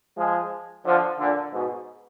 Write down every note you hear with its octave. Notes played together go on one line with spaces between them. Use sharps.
F3 G#3
D3 F3
A#2 D3
G#2 B2